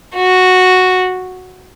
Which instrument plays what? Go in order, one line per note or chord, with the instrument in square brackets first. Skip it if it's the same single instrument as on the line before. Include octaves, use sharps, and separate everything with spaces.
[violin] F#4